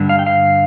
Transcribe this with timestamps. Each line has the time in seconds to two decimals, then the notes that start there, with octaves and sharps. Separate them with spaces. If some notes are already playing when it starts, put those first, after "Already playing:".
Already playing: G2 D3 G3
0.09 F5
0.19 G5
0.26 F5